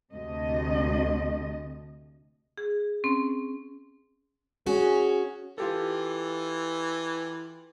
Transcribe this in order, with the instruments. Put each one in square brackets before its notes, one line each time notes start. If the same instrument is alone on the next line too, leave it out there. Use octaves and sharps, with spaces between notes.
[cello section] D2 C3 A3 D#5
[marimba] G#4
C4 C#4
[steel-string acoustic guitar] C#4 F#4 [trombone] G#4
[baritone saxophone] E3 [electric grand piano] F4 G4 A4